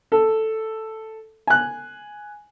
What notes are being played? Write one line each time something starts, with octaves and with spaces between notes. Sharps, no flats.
A4
G#5 F#6